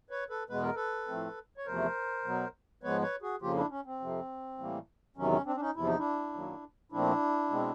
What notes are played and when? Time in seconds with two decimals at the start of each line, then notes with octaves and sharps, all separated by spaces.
0.10 B4 C#5
0.30 A4 B4
0.49 E2 B2 G#3 B3 B4
0.62 A#4
0.76 A4 B4
1.08 A2 F3 A3 C4
1.57 C#5
1.66 E2 C3 F3 A3 A#4 C5
2.25 B2 F#3 B3
2.83 G#2 F3 G#3 B3 B4 C#5
3.02 B4 C#5
3.22 F#4 G#4
3.41 F2 C#3 F3 A#3 F4 G4
3.56 D4 E4
3.70 C#4
3.86 C4
4.00 F2 C3 F3
4.59 A2 E3 G3 A#3
5.16 E2 C3 D#3 F#3 C#4
5.32 C#4
5.46 C4 D4
5.56 D4
5.60 C#4 D#4
5.76 E2 C3 F3 E4
5.86 D#4
5.98 D4 E4
6.33 F#2 D#3 F#3 A#3
6.92 A#2 F3 A3 C4 D4 E4
7.51 B2 G#3 C4